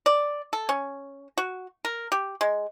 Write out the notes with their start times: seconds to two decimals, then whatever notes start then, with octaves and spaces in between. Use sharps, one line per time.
0.06 D5
0.53 A4
0.69 C#4
1.38 F#4
1.85 A#4
2.12 G4
2.41 G#3